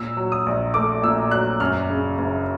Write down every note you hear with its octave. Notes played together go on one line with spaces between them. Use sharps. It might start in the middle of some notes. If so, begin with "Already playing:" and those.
Already playing: A#2 E6
F#3
D#6
A#1
A3 D6
A#2 E6
F#3 F#6
F#2 F6
C#3
F#1